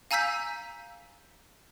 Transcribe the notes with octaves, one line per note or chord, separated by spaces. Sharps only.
F5 G#5 A#5 E6 G6 B6